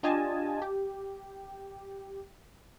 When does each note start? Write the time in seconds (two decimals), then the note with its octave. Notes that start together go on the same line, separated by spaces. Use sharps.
0.03 D4 F4 G4 D#5 G#5 A5
0.62 G4